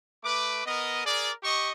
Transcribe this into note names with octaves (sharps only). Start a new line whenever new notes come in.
A3 B4 D6
B3 A#4 D#5
G#4 A#4 D5
G4 D#5 C#6